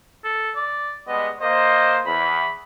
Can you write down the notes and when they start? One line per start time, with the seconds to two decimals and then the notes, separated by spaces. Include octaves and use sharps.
0.24 A4
0.56 D5
1.08 G3 G#3 B3 D#5
1.41 A#3 C5 D#5
2.06 E2 B5